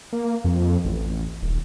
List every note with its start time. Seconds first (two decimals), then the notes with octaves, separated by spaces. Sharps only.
0.13 A#3
0.44 F2
0.85 A1
1.42 D#1